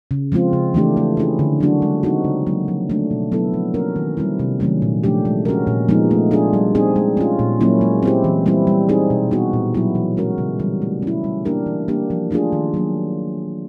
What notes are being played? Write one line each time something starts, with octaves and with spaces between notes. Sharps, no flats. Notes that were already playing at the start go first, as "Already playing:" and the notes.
C#3
F3 G#3 C4 F4
C#3
E3 A3 D4 G4
A3
C#4 E4 G#4
D3
F#3 A#3 D4 F#4
G#3
C4 D#4 F#4
C#3
F#3 A#3
F3
A3 D4
B2
F#3 B3 E4 A4
F3
A#3 C#4 F#4 A#4
D#3
G3 C4 E4
C3
D#3 F#3 A3 C#4
A#2
F3 A3 D4 G4
G#3
C#4 F#4 A#4
A#2
F3 G#3 B3 D#4
A3
D4 F4 G#4
G3
C4 D#4 G#4
G#3
C#4 F4
A#2
F#3 A#3 C#4 E4
G#3
C4 E4 G4
E3
G3 C4 E4
G3
C4 D#4 G#4
B2
G3 B3 D#4 F#4
A#2
F#3 B3 E4
E3
G#3 C#4 F#4 A#4
C#3
E3 G3
A3
C#4 E4
G3
A#3 D4 G4 A#4
E3
G3 A#3 D4 G4
F3
A3 D4 F4 G#4
D#3
F#3 A#3